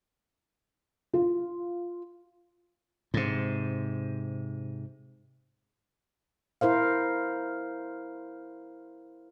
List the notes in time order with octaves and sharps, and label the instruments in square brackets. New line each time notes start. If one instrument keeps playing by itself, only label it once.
[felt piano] F4
[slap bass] G#2 C3
[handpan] E4 A#4 C5 F5